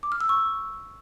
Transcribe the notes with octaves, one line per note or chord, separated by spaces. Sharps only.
D6
F6
E6
C#6